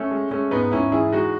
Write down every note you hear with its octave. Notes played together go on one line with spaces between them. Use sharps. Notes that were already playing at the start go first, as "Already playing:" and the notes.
Already playing: A3 C#4
G#3
G#3 A3 C#4
G#2 B3 D#4
G#2 C#4 E4
E3 E4 G#4
G#3 D#4 F#4